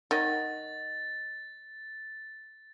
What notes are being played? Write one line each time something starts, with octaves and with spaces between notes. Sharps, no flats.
D#3 C#5 D#5 F#5 A6